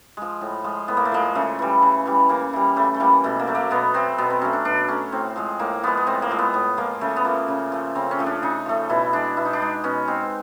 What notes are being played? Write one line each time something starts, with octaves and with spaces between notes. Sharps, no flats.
F3 G#3
A2
F3 G#3
A2 B3
A#3
A3
F3 G#3 A#3
C#3 A3
E3 G3
C#3
E3 G3
C#3 A#3
E3 G3
C#3 A3
A3
E3 G3 A#3
B2 A3
A#3
F#3 A3
A#3
B2 B3
F#3 A3 C4
B2 B3
C4
F#3 A3 C#4
D4
B2 D4
F#3 A3 C#4
A2 C4
F3 G#3
A2 A#3
F3 G#3 B3
B3
A2 C4
A#3
F3 G#3
B3
A2
F3 G#3 A#3
C#3 A3
B3
F3 A3 A#3
C#3
F3 A3
C#3 C4
C#4
F3 A3
D4
C#3 D#4
F3 A3
B2 E4
G#3 D4
B2 E4
D#4
D4
G#3 D#4
B2 C#4
G#3 C4